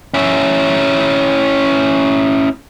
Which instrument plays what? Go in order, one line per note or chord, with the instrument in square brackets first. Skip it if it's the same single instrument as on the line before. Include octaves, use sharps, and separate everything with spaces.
[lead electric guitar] C#4 E4